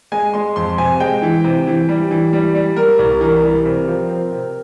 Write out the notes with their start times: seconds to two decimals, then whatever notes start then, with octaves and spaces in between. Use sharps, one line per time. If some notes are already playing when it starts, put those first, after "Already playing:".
0.12 G#3 G#5
0.34 G#3 C6
0.56 F2 C6
0.78 C3 G#5
1.00 G#3 G5
1.22 E3
1.44 C3
1.67 E3
1.89 G3
2.11 E3
2.33 G3
2.55 G3
2.76 G3 A#4
2.99 C2
3.21 E3 A#4
3.43 G3
3.66 C3
3.88 F3
4.10 C4
4.32 C3